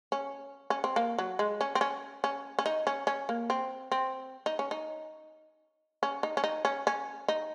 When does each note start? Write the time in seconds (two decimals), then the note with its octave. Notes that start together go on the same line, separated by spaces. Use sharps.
0.12 C#4
0.70 C#4
0.84 C4
0.96 A#3
1.18 F#3
1.39 G#3
1.61 C#4
1.75 C4
1.81 C#4
2.24 C#4
2.59 C#4
2.66 D#4
2.87 C#4
3.07 C#4
3.29 A#3
3.50 C4
3.92 C4
4.46 D#4
4.59 C#4
4.71 D#4
6.03 C#4
6.23 D#4
6.37 C#4
6.44 D#4
6.65 C#4
6.87 C#4
7.28 D#4